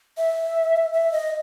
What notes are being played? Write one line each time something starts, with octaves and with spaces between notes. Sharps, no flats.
E5
E5
D#5